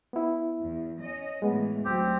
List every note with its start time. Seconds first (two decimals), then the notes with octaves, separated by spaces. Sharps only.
0.13 B3 E4
0.60 E2
1.00 C#4 D#5
1.42 A2 E3 G#3 B3
1.85 D2 F#3 C4 G4